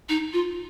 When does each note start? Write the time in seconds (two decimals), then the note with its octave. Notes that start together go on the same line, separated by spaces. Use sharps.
0.09 D#4
0.33 F4